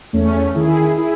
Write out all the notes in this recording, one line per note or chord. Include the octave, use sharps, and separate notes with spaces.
E2 A3 C#4
D#3 E4 G#4
E4 G#4